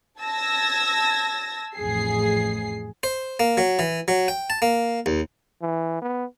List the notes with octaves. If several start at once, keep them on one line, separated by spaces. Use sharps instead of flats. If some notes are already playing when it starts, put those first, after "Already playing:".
A5 E6 G#6 A#6
A1 F2 G#4 C7
C5
A#3
F#3
E3
F#3
G5
A5
A#3
D#2
E3
B3